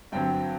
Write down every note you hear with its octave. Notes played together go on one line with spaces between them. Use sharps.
G2 D3 F#3 C4 G5